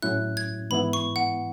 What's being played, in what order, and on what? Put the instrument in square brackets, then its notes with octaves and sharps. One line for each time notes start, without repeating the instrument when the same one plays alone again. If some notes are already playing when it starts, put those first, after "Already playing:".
[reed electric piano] A2 F#3 C#4 E4 [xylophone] F#6
[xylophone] G#6
[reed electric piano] G#2 E3 B3 E4 [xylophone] B5
[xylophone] C#6
F#5